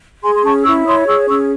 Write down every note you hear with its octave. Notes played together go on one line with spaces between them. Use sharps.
G#4 G#5 C6
C6
C#4 A5 C#6
E4 C#6 E6
C#5 C6 D#6
G#4 C#6 E6
C#4 C#6 E6